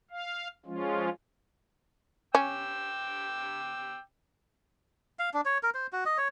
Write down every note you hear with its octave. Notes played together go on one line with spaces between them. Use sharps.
F5
F3 G#3 C#4 F4
C#4 G5 D6 E6
F5
D4
C#5
A#4
C5
F#4
D#5
C#5